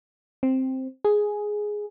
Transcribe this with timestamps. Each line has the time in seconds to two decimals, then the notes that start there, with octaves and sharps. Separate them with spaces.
0.43 C4
1.05 G#4